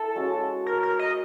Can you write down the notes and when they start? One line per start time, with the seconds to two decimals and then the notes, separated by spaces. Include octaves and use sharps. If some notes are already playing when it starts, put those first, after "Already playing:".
Already playing: E4 A4
0.16 G#3 C#4 F#4
0.66 A#4
0.83 A#4
0.99 D#5